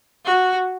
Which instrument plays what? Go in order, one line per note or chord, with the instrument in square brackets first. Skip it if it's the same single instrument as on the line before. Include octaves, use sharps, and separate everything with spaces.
[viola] F#4